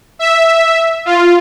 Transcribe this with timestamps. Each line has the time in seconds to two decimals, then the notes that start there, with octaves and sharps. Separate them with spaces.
0.19 E5
1.05 F4